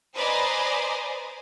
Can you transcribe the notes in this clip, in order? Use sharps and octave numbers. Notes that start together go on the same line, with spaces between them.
B4 C5 D5 D#5 G#5 A#5